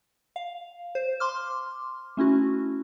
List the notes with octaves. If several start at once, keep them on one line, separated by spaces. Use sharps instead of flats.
F5
C5
C6 D6 F6
A3 C#4 E4 F#4